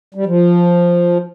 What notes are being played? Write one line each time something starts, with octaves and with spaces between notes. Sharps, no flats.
G3
F3